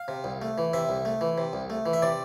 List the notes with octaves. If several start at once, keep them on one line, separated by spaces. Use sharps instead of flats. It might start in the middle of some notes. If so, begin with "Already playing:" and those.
Already playing: F5
C3
C2
A3
E3
C3 E5
C2
A3
E3
C3
C2
A3
E3
E5
C3 D5